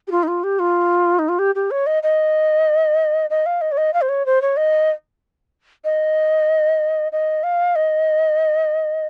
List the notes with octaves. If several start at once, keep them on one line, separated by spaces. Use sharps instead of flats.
G4
F4
D#4
F4
G4
F4
D#4
F4
G4
G4
C#5
D#5
D#5
D#5
F5
D#5
C#5
D#5
F5
C5
C#5
C5
C#5
D#5
D#5
D#5
F5
D#5